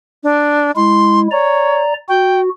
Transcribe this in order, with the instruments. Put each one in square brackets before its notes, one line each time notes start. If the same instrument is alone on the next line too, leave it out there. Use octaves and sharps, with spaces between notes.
[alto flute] D4
[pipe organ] G#3 E4 [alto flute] C6
[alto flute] C#5 [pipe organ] D5 A#5
[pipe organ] F#4 [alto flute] G5